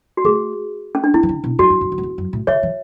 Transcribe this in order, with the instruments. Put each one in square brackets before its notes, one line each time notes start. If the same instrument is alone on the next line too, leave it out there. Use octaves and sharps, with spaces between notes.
[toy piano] F#4
[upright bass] A3 [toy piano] G#4
[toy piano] C#4
D4
[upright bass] B3 [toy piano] E4
[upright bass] E3
D3
B2
[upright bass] F#2 [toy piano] F#4
[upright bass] F#2
F#2
E2
F#2
E2
F#2
A2
[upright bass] D3 [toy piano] C#5 E5
[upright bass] E3